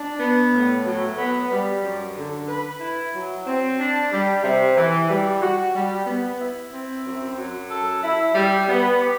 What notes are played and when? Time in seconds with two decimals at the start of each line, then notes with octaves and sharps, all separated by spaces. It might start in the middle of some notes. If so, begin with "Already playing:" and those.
Already playing: D4
0.20 B3
0.53 A2
0.86 F#3
1.18 B3
1.51 G3
1.84 F#2
2.17 D3
2.48 B4
2.81 E4
3.14 F#3
3.46 C4
3.78 D4
4.12 G3
4.44 C3
4.77 E3
5.10 G3
5.41 F#4
5.75 G3
6.06 B3
6.40 E4
6.72 C4
7.05 F#2
7.38 F#3
7.70 A4
8.03 E4
8.35 G3
8.68 B3
9.01 G4